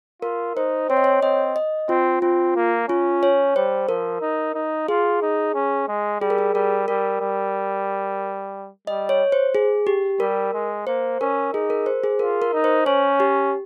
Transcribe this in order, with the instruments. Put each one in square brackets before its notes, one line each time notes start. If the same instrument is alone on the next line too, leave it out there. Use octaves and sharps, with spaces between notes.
[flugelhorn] F4 [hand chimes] A#4
[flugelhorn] D#4 [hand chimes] C5
[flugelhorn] C4 [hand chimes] C#5
[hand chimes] D#5
C#5
[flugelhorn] C4 [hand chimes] D#5
[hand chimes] D#5
[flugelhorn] C4 [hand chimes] F4
[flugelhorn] C4 [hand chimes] F4
[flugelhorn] A#3
[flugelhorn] C#4 [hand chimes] F4
[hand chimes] C#5
[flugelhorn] G3 [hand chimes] C5
[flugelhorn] F3 [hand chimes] A#4
[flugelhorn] D#4
D#4
[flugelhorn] F4 [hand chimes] G#4
[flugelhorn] D#4
C#4
G#3
[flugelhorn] G3 [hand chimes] G#4
[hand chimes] A#4
G#4
[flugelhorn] G3 [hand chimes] A#4
[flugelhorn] G3 [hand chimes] A#4
[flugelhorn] G3
[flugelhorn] G3 [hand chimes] D#5
[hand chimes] C#5
C5
G#4
G4
[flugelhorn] G3 [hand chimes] A#4
[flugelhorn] G#3
[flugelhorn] A#3 [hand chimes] C5
[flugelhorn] C#4 [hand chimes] A#4
[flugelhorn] D#4 [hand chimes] G#4
[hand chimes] A#4
C5
G#4
[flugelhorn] F4 [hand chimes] A#4
[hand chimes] A#4
[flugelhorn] D#4
[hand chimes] C5
[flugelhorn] C#4 [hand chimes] C#5
[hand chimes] G4